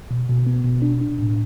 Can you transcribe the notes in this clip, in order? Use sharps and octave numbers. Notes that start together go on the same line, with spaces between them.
B2
B2
B3
B2
D4
D4
A2